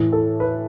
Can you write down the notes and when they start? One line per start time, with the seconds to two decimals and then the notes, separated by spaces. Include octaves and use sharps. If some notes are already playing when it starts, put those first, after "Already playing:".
Already playing: A2 E3
0.12 A4
0.40 B4